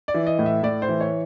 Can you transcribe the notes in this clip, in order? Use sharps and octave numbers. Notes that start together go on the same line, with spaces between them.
D5
E3
D#5
A2
E5
A2 D5
C5
E3
C#5